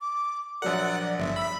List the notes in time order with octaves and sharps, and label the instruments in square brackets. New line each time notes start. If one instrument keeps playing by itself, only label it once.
[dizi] D6
[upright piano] A#1 F#3 A#4 [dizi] D5 [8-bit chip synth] F#5
[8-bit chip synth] G1 [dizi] E5
[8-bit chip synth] B5 [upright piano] E6